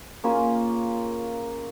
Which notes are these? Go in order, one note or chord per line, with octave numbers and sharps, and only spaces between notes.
A#3 C#4 F4 G#4